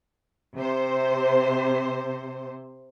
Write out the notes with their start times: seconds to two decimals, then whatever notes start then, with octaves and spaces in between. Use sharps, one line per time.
0.56 C3 C5